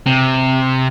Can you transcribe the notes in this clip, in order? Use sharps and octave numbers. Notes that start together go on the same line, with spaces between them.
C3